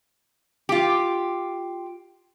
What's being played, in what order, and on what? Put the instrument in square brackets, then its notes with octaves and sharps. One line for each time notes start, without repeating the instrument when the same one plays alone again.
[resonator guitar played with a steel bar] F4 G4